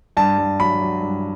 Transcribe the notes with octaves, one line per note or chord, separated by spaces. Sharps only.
G2 A5
G2
F#3 B5
F#3
G2